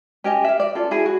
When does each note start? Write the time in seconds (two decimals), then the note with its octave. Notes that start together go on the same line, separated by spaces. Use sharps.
0.24 C#4 G4 D#5 G#5
0.44 E5 F5
0.60 D5
0.75 C#4 F4 A4
0.91 E4 F#4 G#4
1.06 F#4